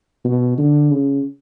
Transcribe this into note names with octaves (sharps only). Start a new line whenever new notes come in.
B2
D3
C#3